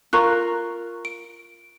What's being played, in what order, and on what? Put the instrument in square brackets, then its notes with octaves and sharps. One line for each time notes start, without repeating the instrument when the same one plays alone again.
[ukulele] F4 A#4 [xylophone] A#5 C#6 F#6
[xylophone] D7